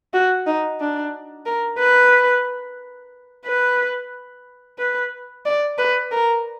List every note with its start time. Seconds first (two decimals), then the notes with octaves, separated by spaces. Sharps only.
0.13 F#4
0.47 D#4
0.80 D4
1.46 A#4
1.79 B4
3.46 B4
4.78 B4
5.45 D5
5.78 B4
6.11 A#4